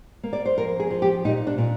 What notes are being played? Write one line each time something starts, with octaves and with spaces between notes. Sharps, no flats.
A#3
D5
C5
F2 A#4
G#4
F3
G4
A#2 D#4
D4
A#2